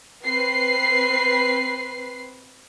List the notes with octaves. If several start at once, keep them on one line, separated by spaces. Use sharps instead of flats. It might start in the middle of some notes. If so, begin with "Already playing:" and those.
C4 B4 C7